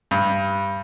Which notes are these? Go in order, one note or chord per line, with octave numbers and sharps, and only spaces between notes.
G2